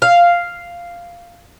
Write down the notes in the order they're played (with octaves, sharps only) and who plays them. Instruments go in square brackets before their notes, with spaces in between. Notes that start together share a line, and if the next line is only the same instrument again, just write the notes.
[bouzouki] F5